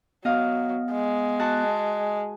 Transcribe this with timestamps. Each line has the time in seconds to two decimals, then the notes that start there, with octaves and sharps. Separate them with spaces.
0.25 F#3 B3 D#5 F5
0.92 G#3
1.39 F#4 A5 F#6